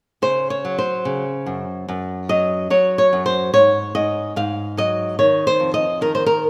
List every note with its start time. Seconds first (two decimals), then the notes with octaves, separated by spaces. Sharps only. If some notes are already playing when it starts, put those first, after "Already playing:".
0.22 C#3 C5
0.50 C#5
0.65 F#3
0.78 C5
1.05 C#3
1.46 F#2
1.88 F#2
2.29 F#3 D#5
2.70 F#3 C#5
2.98 C#5
3.13 F#2
3.26 C5
3.54 G#2 C#5
3.95 G#2 D#5
4.36 G#2 F5
4.77 F#3 D#5
5.19 D#3 C#5
5.47 C5
5.60 F2
5.74 D#5
6.01 D#3 A#4
6.15 C5
6.26 A#4